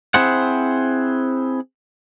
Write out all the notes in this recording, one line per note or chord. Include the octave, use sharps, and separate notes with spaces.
C4 E4 G#4 C5 F#5